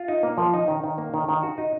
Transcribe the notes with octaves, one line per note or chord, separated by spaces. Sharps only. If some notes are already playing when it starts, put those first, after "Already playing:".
Already playing: F4
D#4
A#3
F3
D#4
D#3
D#3
A#3
D#3
D#3
F#4
D#4